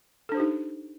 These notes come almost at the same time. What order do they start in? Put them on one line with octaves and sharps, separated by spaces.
A4 D4 C5 G4 D#4